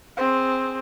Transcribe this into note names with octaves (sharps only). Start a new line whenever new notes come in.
C4 G#4